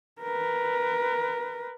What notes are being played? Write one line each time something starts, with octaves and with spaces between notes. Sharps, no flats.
A#4 B4